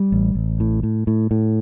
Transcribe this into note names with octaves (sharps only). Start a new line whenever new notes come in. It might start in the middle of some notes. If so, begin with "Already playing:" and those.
Already playing: G3
A1
A1
A2
A2
A2
A2